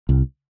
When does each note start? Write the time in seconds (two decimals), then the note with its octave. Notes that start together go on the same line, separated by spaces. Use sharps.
0.09 C2